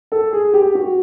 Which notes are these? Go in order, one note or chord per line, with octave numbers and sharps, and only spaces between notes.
A4
G#4
G4
F#4